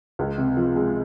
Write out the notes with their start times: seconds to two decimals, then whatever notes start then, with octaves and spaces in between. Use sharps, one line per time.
0.19 C#2
0.38 C3
0.57 F3
0.76 G#3